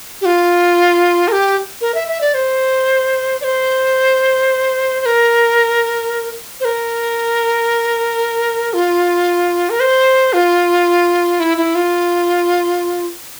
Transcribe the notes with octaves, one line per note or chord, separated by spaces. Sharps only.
G4
F4
A#4
G4
A#4
E5
E5
D5
C5
D5
C5
C5
A#4
C5
A#4
F4
A#4
C5
F4
E4
E4
F4